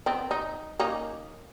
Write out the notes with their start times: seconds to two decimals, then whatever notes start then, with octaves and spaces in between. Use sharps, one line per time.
0.06 B3 C4
0.31 D#4
0.80 A#3 C#4 D#4